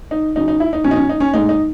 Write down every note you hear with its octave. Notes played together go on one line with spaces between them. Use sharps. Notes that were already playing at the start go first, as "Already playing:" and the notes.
D#4
C#3 F#3 D#4
D#4
E4
D#4
B2 F#3 C#4
D#4
C#4
D#4
C#4
A2 G#3 D#4
D#4